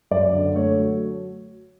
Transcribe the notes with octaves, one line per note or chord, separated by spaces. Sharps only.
F#2 D5
D3
A3 C#5
F#3